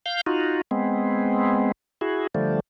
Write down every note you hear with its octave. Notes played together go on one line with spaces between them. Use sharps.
F5 G6
D#4 F4 F#4
G#3 B3 C4
E4 F#4 G#4
D3 F3 G3 A3